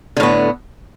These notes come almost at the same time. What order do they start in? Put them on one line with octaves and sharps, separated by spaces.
D3 A2 B3